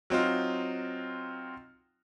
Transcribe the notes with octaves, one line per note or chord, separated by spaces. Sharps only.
F#3 C4 D#4 F4